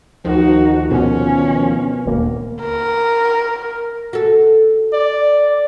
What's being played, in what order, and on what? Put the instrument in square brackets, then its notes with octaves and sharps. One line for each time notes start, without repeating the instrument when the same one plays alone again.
[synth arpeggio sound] D2 D#3 F3 [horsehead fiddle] D#4 F#4
[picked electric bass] B2 [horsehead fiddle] C#4
[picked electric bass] D#1 D2 A#3
[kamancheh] A#4
[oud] F#4 A4
[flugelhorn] D5